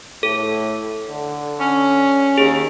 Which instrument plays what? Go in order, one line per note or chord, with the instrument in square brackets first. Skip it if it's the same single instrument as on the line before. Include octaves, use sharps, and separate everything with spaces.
[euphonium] A2 [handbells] A4
[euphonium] D3
[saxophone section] C#4
[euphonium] D#2 [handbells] G#4